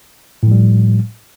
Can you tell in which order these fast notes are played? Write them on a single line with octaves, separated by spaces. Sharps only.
A2 F3 G3